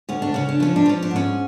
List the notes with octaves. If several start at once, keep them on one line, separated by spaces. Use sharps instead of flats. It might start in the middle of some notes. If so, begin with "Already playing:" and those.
D2 C#4
D4
C#3 C#4
D4
F3 C#4
D4
F3 C#4
D4
G#2 C#4